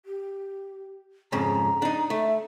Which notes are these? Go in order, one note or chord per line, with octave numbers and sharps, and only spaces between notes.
G4
F2 G#2 C#3 A#5
D4 D#4
A3 E5